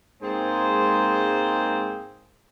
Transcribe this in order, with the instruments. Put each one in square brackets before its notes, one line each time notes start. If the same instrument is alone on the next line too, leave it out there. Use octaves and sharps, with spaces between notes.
[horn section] G#2 G#3 A#3 C4 G#4 C5